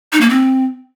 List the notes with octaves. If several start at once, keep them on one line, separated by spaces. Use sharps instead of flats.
D#4
A#3
C4